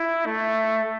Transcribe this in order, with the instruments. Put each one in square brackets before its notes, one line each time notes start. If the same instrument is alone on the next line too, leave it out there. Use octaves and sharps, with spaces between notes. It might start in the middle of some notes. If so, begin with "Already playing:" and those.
Already playing: [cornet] E4
A3